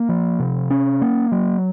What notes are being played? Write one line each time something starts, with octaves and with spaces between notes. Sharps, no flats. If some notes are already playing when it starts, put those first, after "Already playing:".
Already playing: A#3
F3
C3
C#4
A#3
F#3